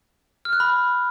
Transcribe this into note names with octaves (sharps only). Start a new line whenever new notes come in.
F6
F#6
B5